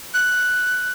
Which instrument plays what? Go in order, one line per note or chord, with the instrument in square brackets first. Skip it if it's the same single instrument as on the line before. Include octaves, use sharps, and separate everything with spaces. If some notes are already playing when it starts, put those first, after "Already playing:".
[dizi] F#6